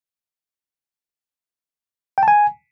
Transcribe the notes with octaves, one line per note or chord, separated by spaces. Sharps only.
G5
A5
G#5